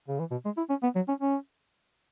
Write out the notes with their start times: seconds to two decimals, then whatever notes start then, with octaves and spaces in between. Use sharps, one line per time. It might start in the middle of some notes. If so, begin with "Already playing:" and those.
0.08 C#3
0.19 E3
0.31 B2
0.45 G#3
0.57 E4
0.70 C#4
0.83 B3
0.95 F#3
1.08 C#4
1.20 C#4